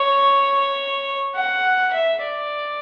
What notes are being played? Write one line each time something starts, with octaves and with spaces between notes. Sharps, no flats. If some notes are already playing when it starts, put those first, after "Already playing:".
Already playing: C#5
F#5
E5
D5